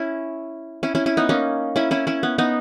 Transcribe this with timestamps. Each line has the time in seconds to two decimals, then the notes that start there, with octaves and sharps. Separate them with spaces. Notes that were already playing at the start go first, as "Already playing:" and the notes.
Already playing: C#4 E4
0.83 C#4 E4
0.95 C#4 E4
1.06 C#4 E4
1.17 B3 D#4
1.29 A#3 C#4
1.76 C#4 E4
1.91 C#4 E4
2.07 C#4 E4
2.23 B3
2.38 B3 D#4